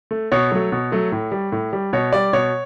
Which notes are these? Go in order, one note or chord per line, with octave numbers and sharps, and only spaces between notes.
A3
B2 C#5
F#3 A3
B2
F#3 A3
A2
G3
A2
G3
B2 C#5
G3 D5
B2 C#5